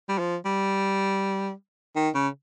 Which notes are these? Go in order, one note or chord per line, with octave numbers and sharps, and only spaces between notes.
G3
F3
G3
D#3
C#3